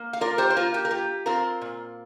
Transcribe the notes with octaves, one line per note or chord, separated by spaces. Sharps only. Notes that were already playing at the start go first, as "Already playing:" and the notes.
Already playing: A#3
F5
F4 A#4 D5
G4 C5
C5
A#3 F4 A#4
G4
A#4
F4 G4
C4 F4 A#4
A#2